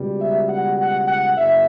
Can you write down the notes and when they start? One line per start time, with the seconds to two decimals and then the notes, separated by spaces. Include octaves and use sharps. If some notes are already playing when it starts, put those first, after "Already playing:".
Already playing: C#2 B2 G3
0.19 E5
0.48 F#5
0.78 F#5
1.07 F#5
1.37 F#1 E5